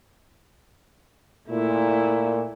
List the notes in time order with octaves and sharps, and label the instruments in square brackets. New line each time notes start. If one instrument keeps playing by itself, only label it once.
[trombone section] A#2 [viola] A3 E4